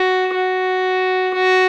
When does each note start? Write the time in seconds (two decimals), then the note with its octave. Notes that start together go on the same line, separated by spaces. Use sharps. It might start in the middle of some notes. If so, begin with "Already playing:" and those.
Already playing: F#4
0.34 F#4
1.34 F#4